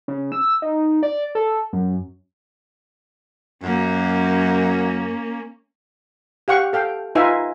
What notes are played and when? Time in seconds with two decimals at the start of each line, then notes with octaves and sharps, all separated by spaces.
0.08 C#3
0.32 E6
0.62 D#4
1.03 D5
1.35 A4
1.73 F#2
3.63 F#2 A#3 C#4
6.48 G4 F5 F#5 C#6
6.73 A4 F5 G5
7.15 D#4 F4 B4 E5 G#5